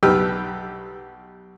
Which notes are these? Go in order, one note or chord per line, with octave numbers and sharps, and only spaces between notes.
B1 G3 G4 B4 E6 F6